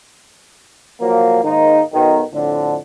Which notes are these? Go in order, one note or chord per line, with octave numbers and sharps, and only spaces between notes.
F3 F#3 A#3
G#2 D#3 G#3 A#3 D#4
B1 B2 D#3
F2 A2 D3